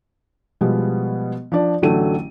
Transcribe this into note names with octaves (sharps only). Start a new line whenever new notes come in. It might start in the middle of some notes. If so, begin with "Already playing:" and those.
B2 F3 G3 G#3 B3
F3 D4 D5
A1 D3 F#3 A3 D#7